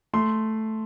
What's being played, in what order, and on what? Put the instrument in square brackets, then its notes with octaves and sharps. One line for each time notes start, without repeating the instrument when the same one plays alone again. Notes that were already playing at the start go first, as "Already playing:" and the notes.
[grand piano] A3 C6